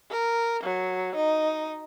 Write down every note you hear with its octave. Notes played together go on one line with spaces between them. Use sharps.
A#4
F#3
D#4